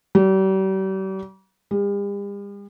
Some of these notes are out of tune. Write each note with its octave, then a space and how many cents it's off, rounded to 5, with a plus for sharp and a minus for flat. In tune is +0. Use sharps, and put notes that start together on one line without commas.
G3 -40
G3 +45